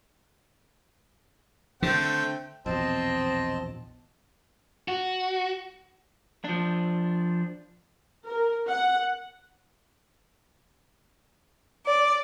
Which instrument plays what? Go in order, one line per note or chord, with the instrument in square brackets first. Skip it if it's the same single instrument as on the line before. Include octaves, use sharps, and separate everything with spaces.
[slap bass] D3 [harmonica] A3 C4 G5
[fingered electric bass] A#1 E2 B2 [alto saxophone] C4 [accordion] D#5 A5 C6
[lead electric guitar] F#4
F3 D4
[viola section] A#4
F#5
[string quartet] D5